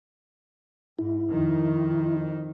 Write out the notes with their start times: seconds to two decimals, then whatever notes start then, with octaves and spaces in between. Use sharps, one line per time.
0.99 G#2 E4
1.31 F2 D#3